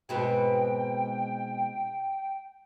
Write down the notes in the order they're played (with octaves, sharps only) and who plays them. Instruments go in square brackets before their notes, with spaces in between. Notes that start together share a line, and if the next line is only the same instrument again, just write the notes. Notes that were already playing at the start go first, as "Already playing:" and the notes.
[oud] G#2 B2 C4 [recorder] G5